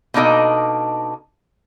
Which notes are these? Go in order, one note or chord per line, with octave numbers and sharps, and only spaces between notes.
B2 A#3 D4 D#4 A4 D#5